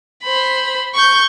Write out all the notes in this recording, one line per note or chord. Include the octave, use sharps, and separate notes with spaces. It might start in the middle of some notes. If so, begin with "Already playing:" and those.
C5 B5
C#6 G6